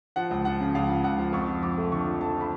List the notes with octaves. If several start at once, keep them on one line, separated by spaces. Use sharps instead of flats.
F3 F#5
C#2
F3 F#5
C#3
C#2 F5
C#3
C#2 F#5
F3
F2 C#6
F3
F3 D6
A3
D3 C#6
F3
A3 A5
F3
B5